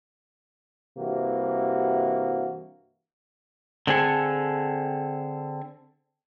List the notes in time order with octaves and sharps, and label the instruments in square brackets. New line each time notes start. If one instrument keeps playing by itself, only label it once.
[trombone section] G2 C3 E3 A#3 F#4
[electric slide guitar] D3 C4 G#4 A4